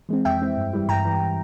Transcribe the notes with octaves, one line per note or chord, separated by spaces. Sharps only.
E3 G#3 C4
F2 E5 G5
E3 G#3 C4
G2
E3 G3
G2 G5 A#5
E3 G3